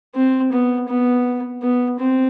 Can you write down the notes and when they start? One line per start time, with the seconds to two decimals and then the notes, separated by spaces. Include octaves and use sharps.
0.15 C4
0.52 B3
0.89 B3
1.62 B3
1.99 C4